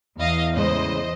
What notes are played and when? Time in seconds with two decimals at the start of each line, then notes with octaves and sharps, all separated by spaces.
0.19 E2 D#5 F5
0.55 A2 C#3 G#3 C5 D#5